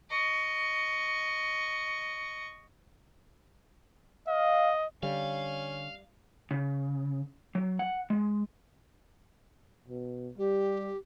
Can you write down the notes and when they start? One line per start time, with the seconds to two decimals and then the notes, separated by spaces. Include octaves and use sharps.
0.10 D#5 C#6
4.28 D#5 F5
5.03 D3 G3 C#4 F5
6.51 C#3
7.55 F#3
7.79 F#5
8.10 G#3
9.88 B2
10.38 G3 G4